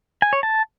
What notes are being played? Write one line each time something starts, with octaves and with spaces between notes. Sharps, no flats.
G#5
C#5
A5